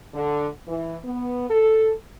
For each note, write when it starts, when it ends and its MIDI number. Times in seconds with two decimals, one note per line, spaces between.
0.14 0.47 50
0.68 0.96 52
1.03 1.48 59
1.49 1.92 69